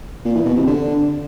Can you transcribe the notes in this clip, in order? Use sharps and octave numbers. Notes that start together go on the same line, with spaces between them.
A#2
E3
B2
C3
D3